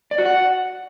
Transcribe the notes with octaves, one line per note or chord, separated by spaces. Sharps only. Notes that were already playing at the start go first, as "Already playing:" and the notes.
D5
F#4
F#5